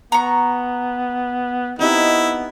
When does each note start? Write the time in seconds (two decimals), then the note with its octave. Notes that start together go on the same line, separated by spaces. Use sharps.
0.12 B3 A#5 C#6
1.79 B3 C4 D#4 E4 G4